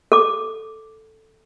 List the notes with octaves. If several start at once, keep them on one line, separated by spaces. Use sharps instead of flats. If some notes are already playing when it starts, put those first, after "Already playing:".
A4 D6